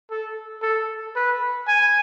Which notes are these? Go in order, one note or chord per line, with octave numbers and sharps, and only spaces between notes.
A4
A4
B4
G#5